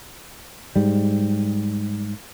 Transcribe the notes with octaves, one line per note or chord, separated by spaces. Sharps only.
G#2 G3